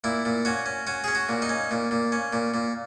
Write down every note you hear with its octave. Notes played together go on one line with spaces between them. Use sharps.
A#2 E4
A#2
C#4 F#4
C#4
C#4 F#4
C#4 G#4
F#4
A#2
D#4
C#4
A#2
A#2
C#4
A#2
A#2